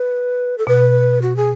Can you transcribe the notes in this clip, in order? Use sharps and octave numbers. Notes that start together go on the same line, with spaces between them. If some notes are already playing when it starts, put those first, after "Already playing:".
Already playing: B4
A4
B2 B4
F#4
G#4